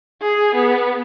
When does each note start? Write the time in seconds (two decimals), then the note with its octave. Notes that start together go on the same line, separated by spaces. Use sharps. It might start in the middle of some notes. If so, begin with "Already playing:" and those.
0.22 G#4
0.55 B3